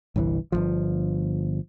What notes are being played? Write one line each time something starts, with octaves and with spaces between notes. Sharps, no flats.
G1 C2 C3 E3
G1 C2 F3